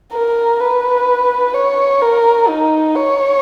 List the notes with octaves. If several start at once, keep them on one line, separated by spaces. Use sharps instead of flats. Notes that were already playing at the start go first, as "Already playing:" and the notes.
A#4
B4
C#5
A#4
D#4
C#5